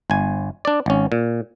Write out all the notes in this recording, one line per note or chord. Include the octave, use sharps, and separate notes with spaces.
G1 G#5
D4 D5
G#1 C#4
A#2